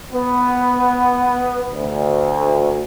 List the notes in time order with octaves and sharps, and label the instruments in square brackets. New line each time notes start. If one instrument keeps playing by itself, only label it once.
[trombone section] B3
D2